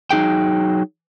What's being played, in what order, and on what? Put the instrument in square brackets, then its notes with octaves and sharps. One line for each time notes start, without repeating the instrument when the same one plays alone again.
[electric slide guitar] F#3 D#4 G#4 G5